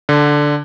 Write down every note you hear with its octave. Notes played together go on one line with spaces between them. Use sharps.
D3